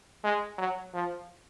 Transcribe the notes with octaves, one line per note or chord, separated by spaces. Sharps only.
G#3
F#3
F3